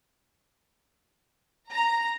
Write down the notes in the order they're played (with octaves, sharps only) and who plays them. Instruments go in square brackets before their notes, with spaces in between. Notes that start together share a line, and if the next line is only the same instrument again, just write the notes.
[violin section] A#5